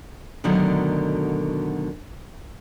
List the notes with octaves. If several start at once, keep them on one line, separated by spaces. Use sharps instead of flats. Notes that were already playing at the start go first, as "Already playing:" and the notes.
D2 B2 D3 D#3 F#3